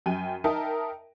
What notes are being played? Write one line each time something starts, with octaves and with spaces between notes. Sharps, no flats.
F#2 G5 G#5 D#7
D#4 A#4 E5 G5 A5